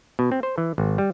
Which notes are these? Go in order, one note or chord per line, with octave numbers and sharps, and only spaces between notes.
B2
C4
C5
E3
G#1
G3